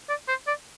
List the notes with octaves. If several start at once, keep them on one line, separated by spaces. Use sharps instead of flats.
D5
C5
D5